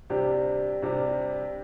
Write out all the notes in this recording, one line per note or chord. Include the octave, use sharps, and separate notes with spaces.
C3 G3 D4 G4
C3 G3 D4 G4